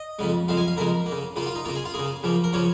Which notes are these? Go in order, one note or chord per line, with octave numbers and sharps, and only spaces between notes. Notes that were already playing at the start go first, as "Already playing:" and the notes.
Already playing: D#5
F2 C#3 G#3
F2 C#3 G#3 F5
G#5
F5
F2 C#3 G#3 A#4
A#3
C#3
C#3 A#3 F4
F4
D#4
C#3 A#3 F4
G#4
F4
C#3 A#3 G#4
C#3 F3 A#3
A#4
C#3 F3 A#3 C#5